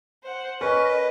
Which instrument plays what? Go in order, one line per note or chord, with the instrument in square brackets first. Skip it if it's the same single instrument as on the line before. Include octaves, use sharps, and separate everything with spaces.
[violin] C5 F#5
[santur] C#4 [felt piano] A#4 [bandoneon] B4 [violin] D#5